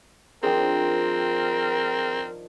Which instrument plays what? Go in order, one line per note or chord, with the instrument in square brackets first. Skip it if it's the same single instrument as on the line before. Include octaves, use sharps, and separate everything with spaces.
[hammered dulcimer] D#3 F3 D4 [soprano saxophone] C4 [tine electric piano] G#4 G5 [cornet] A#4